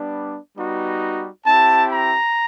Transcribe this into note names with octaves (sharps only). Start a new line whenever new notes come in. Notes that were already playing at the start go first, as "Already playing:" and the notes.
Already playing: G3 B3 D4
G3 B3 D#4 F#4
C4 E4 G4 A5
A#5